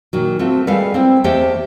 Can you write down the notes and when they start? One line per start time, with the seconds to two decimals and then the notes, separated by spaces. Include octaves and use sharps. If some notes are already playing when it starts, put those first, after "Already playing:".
0.13 A#2 D#3 F#3
0.39 A3 C4 F4 F#4
0.67 G3 G#3 A4 B4 F5
0.94 C4 E4 C5
1.24 E2 A3 G4 C5 D#5 G5